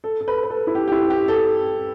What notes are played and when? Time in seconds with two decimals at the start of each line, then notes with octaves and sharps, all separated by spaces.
0.04 A4
0.21 A4
0.28 B4
0.43 B4
0.50 A4
0.67 E4
0.75 G4
0.88 G4
0.92 E4
1.10 G4
1.28 A4